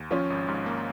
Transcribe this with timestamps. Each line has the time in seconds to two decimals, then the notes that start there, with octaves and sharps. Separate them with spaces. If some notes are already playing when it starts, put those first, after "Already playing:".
Already playing: D#2
0.10 F3 C#4 F4
0.30 G#1
0.48 G#2
0.66 A#3